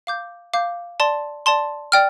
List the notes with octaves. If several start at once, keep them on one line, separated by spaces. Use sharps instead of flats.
F5 D6 G6
F5 D6 G6
D5 A5 C6
D5 A5 C6
D5 G5 F6